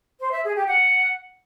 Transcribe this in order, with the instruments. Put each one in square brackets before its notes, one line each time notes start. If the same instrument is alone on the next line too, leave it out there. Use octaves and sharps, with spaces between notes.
[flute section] C5
E5
G#4
G4
F#5